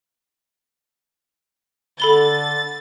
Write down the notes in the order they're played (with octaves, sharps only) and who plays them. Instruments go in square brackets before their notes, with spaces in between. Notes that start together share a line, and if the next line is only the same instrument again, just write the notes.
[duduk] D3 [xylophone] A4 B5 G7 [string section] A6